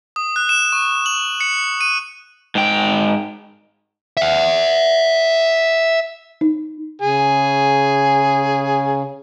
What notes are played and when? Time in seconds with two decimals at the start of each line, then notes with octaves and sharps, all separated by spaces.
0.16 D#6
0.36 F#6
0.49 E7
0.73 C#6
1.06 F#7
1.41 C#7
1.81 D#7
2.55 G#2 G5
4.17 E5 F#5
6.41 D#4
7.02 C#3 G#4